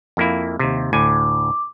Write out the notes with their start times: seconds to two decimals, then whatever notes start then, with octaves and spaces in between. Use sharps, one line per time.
0.17 F2 A#3 E4
0.59 D#2 C3
0.93 D2 A2 G#5 D6